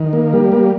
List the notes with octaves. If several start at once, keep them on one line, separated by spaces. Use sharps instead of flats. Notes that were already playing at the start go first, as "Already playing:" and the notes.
Already playing: D#3
A#3
G3
A#3